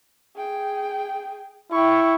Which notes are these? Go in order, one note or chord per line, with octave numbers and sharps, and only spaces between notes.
G#4 G5
E4 G5 C#6